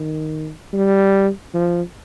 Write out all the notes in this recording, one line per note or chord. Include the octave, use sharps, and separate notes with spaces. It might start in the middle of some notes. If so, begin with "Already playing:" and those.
Already playing: D#3
G3
F3